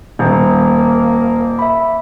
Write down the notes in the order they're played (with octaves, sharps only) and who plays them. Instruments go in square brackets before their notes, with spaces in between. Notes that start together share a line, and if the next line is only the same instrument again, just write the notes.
[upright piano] D#1 [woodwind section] A#3
[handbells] E5 B5